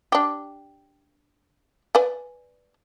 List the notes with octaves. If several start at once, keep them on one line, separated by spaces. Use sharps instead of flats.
D4 G4
B4 D5 G#5